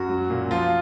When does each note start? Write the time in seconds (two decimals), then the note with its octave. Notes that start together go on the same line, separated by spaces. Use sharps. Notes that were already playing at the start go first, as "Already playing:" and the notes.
Already playing: F#2 F#4
0.09 F#3
0.30 A#2
0.51 F3 F4